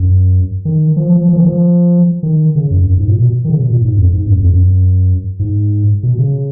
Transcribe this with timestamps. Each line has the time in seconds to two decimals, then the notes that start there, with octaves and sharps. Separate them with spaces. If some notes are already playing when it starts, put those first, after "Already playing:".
Already playing: F#2
0.65 D#3
0.96 F3
1.12 F3
1.29 F3
1.36 D#3
1.43 F3
2.23 D#3
2.55 C#3
2.71 F#2
2.87 F#2
2.98 G#2
3.08 A#2
3.18 B2
3.45 D#3
3.50 C#3
3.60 B2
3.71 A#2
3.82 G#2
3.98 F2
4.13 G#2
4.27 F#2
4.39 F2
4.53 F#2
5.39 G#2
6.03 B2
6.18 C#3